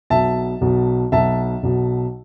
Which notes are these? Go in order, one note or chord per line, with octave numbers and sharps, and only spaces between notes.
B1 B2 E5 A5
B1 B2
B1 B2 E5 A5
B1 B2